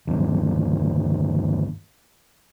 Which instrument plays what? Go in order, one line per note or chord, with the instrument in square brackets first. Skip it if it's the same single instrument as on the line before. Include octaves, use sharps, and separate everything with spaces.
[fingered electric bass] G1 D#2